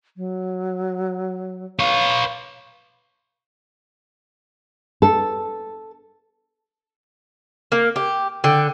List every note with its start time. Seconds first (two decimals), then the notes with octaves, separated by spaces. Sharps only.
0.17 F#3
1.79 B4 C#5 F5
5.02 A4
7.72 A#3
7.96 G4
8.44 D3 G5